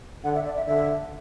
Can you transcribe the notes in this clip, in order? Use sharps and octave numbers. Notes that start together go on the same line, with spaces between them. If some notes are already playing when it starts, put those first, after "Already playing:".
D3 F#5
E5
D5
E5
D3 E5